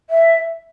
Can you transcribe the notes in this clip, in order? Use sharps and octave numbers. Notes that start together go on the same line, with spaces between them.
E5